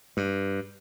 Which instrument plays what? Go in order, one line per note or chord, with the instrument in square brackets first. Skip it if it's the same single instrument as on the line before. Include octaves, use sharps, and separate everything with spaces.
[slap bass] G2